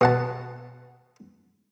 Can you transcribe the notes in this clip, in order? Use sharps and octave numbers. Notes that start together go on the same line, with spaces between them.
B2 F#5 A5